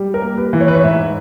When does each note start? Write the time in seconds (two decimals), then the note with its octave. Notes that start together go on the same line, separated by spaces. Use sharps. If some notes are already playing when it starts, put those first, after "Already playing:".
Already playing: G3
0.14 A#4
0.22 A#3
0.37 B4
0.53 E3
0.61 C#5
0.68 B4
0.75 C#5
0.84 G#2 E5